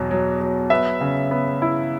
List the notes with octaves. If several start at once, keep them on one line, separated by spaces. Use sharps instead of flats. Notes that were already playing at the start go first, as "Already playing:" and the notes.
Already playing: E2 B2 F#3
F#3
F#3
B3 E5
C#3
B3
E4